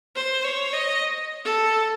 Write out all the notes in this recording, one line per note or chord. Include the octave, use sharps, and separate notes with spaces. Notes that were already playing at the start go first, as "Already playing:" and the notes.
C5
C#5
D#5
A4